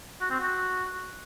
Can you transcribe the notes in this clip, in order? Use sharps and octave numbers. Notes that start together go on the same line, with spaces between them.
F#4
C4
F#4